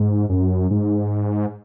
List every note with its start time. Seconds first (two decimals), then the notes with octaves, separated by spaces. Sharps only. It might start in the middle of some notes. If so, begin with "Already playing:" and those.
Already playing: G#2
0.29 F#2
0.71 G#2